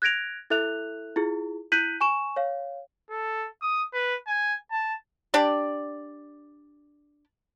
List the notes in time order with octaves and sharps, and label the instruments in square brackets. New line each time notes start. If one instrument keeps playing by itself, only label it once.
[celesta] F#6 G#6 A#6 D7 F7
E4 A4 E5 F#6 F7
E4 F4 G#4
E4 F#6 G6 B6 D#7 F#7
G#5 C#6 E7
C#5 F5
[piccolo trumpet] A4
D#6
B4
G#5
A5
[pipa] D4 G4 D5